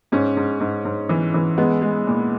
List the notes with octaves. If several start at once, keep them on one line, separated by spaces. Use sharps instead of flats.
G#2 C#4
G#2
G#2
G#2
E3
E3
G#3 B3
G#3
A#2